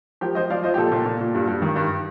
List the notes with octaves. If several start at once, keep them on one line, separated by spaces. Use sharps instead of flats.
F3 G4 A#4
F3 C5 D#5
F3 D5 F5
F3 C5 D#5
G4
A#2 A4
A#2
A#2
A#2
G2
G2
D#3
G2